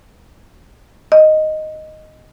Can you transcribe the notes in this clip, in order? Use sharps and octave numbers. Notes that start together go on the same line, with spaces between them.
D#5